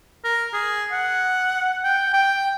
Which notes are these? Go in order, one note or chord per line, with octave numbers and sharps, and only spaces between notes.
A#4
G#4
F#5
G5
G5